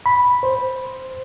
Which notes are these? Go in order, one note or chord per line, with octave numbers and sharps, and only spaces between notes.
B5
C5